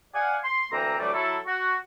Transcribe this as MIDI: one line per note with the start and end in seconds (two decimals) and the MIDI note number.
0.14 0.37 74
0.14 0.37 77
0.14 0.37 78
0.14 0.37 80
0.44 0.68 84
0.72 0.97 38
0.72 0.97 52
0.72 0.97 58
0.72 0.97 60
0.72 0.97 79
0.72 0.97 82
0.99 1.13 38
0.99 1.13 52
0.99 1.13 54
0.99 1.13 55
0.99 1.13 57
0.99 1.13 74
1.13 1.37 54
1.13 1.37 64
1.13 1.37 69
1.46 1.76 66